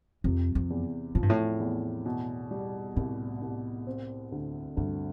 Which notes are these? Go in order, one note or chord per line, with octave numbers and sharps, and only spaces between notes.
F2 C3
F2
E2
A2 F3
G2
A2
E2
B2
G3
C2 A2
C2
C4
D2
D2 G2